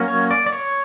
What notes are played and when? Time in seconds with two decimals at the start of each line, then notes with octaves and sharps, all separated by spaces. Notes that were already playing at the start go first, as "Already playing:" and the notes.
Already playing: F#3 A#3 C#4
0.08 C#5
0.31 D5
0.46 D5
0.53 C#5